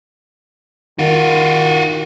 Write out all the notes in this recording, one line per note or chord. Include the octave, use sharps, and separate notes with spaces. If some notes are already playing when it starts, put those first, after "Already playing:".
D#3 F4 F#4